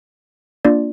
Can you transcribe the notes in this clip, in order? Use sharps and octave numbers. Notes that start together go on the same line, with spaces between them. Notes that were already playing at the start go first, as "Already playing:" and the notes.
A#3 D4 F4 D5